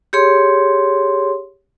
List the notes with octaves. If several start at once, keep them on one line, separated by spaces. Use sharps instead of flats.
G4 G#4 C#5 C6